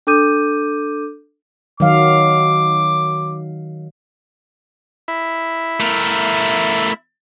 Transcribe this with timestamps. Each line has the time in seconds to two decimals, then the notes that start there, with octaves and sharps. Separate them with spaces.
0.07 D4 A4 D6 G6 D#7
1.80 D#3 F#3 F5 D6
5.08 E4
5.80 A3 A#4